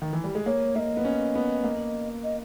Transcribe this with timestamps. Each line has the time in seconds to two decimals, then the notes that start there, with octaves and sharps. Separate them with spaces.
0.02 D#3
0.13 E3
0.24 G3
0.35 G#3
0.46 A#3 C#5
0.75 A#3 E5
0.79 D#5
0.97 B3
1.05 C#4
1.35 B3
1.64 A#3
2.23 D#5